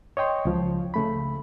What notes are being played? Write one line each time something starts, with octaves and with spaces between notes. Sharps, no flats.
C#5 D#5 G5 C6
C#2 F3
C#3 A3 B5